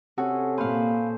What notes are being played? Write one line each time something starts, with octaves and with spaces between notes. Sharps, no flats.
C3 C#4 F#4 G#4 A4
A#2 B4 C5 F5